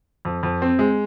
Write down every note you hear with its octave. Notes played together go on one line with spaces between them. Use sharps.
F2
F2
C4
G#3